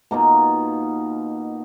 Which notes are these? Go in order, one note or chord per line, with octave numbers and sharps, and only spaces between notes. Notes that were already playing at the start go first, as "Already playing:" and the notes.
B2 A#3 D#4 F4